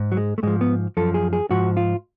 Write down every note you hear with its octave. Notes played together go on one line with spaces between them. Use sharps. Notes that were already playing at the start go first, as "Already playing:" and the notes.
Already playing: G#2
F#3
G#3
A3
G#2 F3 G#3
B3
F#2 F3 A4
G#4
G#4
G#2 F3 F#4
F4